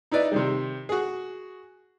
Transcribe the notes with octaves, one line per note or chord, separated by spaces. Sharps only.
D#4 E4 B4 D5 D#5
C3 D#3 G3
F#4 G#4